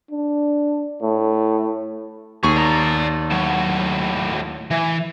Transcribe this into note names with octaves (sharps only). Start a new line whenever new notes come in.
D4
A2
D#2 G#4 C#6
D5 A#5
A2 F#3
E3